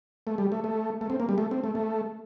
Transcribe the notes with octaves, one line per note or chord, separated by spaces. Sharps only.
A3
G3
A3
A3
A3
C4
A#3
G3
A3
C4
A3
A3